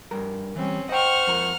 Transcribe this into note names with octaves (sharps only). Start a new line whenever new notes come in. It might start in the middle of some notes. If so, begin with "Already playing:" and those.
G2 A#4
E3 G3 C4 C#4
C5 D#5 F#5 G5 C#6 F6
F2 A#4